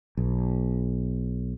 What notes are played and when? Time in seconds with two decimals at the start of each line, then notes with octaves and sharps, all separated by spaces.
0.17 B1